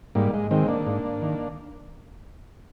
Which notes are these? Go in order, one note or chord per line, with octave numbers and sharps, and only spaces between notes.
G#2 G3 A#3
G#3
D#3 G#3 C4
A#3 D4
G#2
D#3